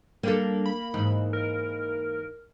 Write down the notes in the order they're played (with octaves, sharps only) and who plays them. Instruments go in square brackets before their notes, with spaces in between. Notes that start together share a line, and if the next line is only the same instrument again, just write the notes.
[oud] G3 D4 A4 [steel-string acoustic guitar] A#3
[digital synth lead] B5
[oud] G#2 E3 D#4
[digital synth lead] A#4